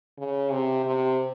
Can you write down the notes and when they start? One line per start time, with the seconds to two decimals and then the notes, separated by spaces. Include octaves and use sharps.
0.18 C#3
0.52 C3
0.85 C3